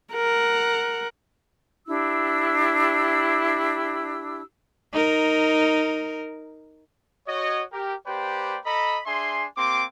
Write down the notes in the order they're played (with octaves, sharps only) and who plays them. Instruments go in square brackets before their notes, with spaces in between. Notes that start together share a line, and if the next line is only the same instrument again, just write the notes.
[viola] A#4 F#5
[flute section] D4 E4 G4 E6
[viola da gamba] D#4 A#4
[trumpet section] F#4 C#5 D#5
G4 A#4
A#3 G4 B4 C5 D5 G5
A4 D#5 A#5 B5
D4 G#4 E5 G#5 C6
A#3 C4 G4 C6 D6